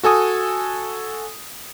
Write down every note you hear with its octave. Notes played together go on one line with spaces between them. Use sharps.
F#4 A4 G#5 D#6